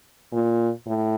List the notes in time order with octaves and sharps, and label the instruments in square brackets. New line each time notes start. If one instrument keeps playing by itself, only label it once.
[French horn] A#2
A2